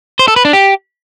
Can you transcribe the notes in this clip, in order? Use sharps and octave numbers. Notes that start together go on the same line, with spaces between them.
C5
A4
B4
D4
G4